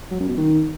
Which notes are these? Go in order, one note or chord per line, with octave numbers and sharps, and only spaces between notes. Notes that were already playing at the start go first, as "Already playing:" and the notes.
F#3
F#2
B2
D#3